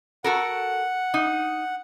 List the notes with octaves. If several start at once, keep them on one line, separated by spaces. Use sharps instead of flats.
F#4 A4 A#4 F#5
D#4